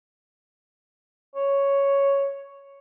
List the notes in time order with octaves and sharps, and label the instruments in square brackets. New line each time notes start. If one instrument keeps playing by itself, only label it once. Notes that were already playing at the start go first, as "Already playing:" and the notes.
[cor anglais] C#5